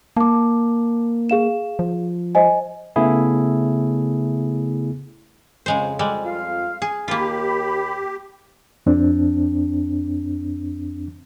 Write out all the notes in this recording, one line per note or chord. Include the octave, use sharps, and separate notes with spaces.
A#3 A5 D6
G#4 F5 E7
F3
C5 D#5 G#5
C#3 A3 B3 E4 G#4
F2 C#3 G#3 C5
G3 G#3
F4 F5
G#4
D#2 A#3 F4 G4 B5
F2 C4 D4